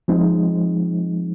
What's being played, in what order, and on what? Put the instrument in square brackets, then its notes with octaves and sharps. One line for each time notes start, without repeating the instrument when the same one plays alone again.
[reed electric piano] F3 G#3 C4 D#4